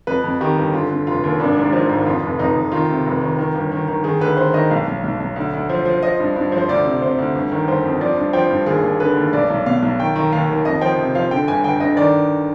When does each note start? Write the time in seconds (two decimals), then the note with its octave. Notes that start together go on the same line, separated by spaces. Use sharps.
0.07 F2 B4
0.24 F2
0.41 D#3 G4
0.57 G1
0.74 D3 F4
0.90 D3
1.07 F1 F4
1.24 D#2
1.39 G#1 D4
1.57 G#2
1.72 F3 D#4
1.89 G#1
2.06 F2 F4
2.22 F1
2.39 F1 D#4
2.56 F1
2.71 D#3 F4
2.89 C3
3.05 F1
3.22 D#3
3.39 D#3
3.55 G1
3.72 D#3
3.88 D#3
4.04 D#3 G#4
4.20 D2 B4
4.37 D#3 C5
4.54 D#3 D#5
4.70 B1 F5
4.87 B1
5.04 B1
5.20 B1
5.36 D2
5.53 D2
5.69 F3
5.85 F3
6.03 F3 D#5
6.20 G2
6.36 G2
6.52 F3
6.57 C5
6.68 D2 D5
6.85 C3
7.02 C3 C5
7.18 D2
7.35 G1
7.52 D#3
7.68 G1 C5
7.84 F2
8.01 F3 D5
8.17 G2
8.33 F3 G5
8.50 G2
8.66 D#2 G#4
8.83 D#2
9.00 D3 B4
9.17 D#2
9.33 B1 D5
9.50 B1
9.66 B2 F5
9.82 B1
9.99 D#3 G5
10.16 D#3
10.32 D#2 F5
10.49 D#2
10.65 F2 D#5
10.81 F3 G5
10.98 C3
11.15 F3 F5
11.31 D3 G5
11.48 G1 G#5
11.64 G1 G5
11.80 D3 D#5
11.97 D#3 D5